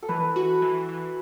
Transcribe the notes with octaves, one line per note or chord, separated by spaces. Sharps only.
A4
E3 B4
F#4
E3
E3